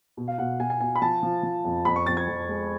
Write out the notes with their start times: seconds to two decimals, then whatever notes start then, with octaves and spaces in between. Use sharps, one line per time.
0.17 B2
0.28 F5
0.38 B2 F#5
0.60 B2 G#5
0.70 G#5
0.80 B2 G#5
0.95 B5
1.02 F3 A5
1.23 F3
1.43 F3
1.65 F2
1.85 F2 B5
1.96 C#6
2.06 F2 A6
2.17 G#6
2.28 F2
2.49 G#3